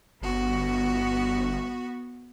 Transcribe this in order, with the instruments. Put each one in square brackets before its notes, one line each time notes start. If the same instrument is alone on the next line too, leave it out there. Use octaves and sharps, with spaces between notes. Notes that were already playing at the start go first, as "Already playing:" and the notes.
[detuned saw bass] G1 [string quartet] B3 F#4